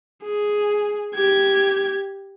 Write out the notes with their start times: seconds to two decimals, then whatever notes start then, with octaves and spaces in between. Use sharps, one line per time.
0.23 G#4
1.15 G4 G#6